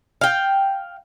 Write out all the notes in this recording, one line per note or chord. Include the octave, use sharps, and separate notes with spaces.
F5 G5